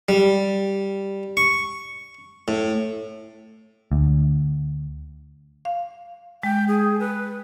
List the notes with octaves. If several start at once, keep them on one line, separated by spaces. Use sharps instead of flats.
G3
C#6
A2
D2
F5
G#3 G5
G#4
B4